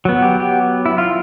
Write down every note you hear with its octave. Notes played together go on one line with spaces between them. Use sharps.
F#3 B3
G4
G4
E4
F4